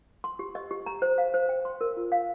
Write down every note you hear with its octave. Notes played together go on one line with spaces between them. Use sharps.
C6
G4
D#5
G4
A#5
C5
F5
C5
G5
C6
A#4
F4
F5